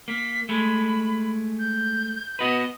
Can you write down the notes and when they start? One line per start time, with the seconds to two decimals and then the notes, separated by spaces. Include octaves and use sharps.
0.08 A#3 B6
0.49 G#3 A3 B5
1.58 G6
2.39 B3 F#4 B4 D#5